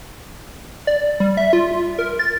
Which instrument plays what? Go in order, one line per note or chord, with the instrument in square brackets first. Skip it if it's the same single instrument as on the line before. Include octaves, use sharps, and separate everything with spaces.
[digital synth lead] D5
G3
E5
F4
A#4
A6